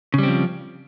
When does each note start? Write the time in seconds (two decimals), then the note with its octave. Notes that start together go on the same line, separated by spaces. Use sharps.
0.14 C#3
0.18 G3
0.23 C4
0.28 F3